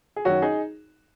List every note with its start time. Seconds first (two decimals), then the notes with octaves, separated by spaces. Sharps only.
0.16 G#4
0.25 F#2 D#3 F#3 C#4 F#4
0.42 D#4 G#4